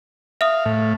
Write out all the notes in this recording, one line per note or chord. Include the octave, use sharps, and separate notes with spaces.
E5 F5 D#6
A2